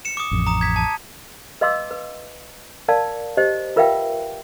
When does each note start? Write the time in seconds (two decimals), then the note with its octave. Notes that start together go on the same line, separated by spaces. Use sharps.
0.05 C#7 E7
0.17 D6 D#6
0.31 A1 F2
0.47 A#5 D#6
0.61 G#6 B6
0.76 A5
1.61 B4 D#5 F5 C6 D6 E6
1.91 B4
2.88 A#4 D5 F5 A5
3.37 G4 C5 D#5
3.76 F4 A#4 B4 E5 F5 G5